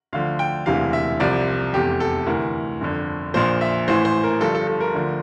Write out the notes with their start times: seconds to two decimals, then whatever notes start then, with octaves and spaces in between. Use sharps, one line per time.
0.13 D2 D3 F3 F5
0.39 G5
0.66 E1 D2 C3 E3 F5
0.93 E5
1.20 C2 C3 F3 D5
1.74 F1 E2 C3 G4
2.00 A4
2.26 D2 C3 E3 A#4
2.81 G1 F2 D3
3.34 A#1 A#2 F3 C5
3.61 E5
3.88 A1 A2 E3 C5
4.05 C5
4.24 A#4
4.41 G1 G2 F3 A4
4.55 A4
4.68 A4
4.81 A#4
4.94 D2 D3 F3